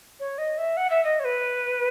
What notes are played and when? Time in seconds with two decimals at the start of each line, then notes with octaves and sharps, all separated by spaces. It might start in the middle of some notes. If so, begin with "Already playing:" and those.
0.20 C#5
0.38 D#5
0.58 E5
0.77 F#5
0.90 E5
1.05 D#5
1.20 C#5
1.25 B4